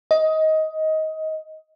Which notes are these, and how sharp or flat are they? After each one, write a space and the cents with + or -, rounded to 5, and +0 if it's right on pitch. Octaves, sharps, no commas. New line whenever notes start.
D#5 +15